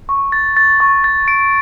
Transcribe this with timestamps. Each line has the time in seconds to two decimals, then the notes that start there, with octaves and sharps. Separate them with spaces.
0.09 C#6
0.32 A6
0.57 A6
0.80 C#6
1.04 A6
1.28 D7